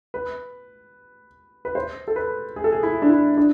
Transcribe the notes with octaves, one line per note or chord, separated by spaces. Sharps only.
B4
B4
C5
A4
B4
G#4
A4
G#4
E4
D4
E4
D4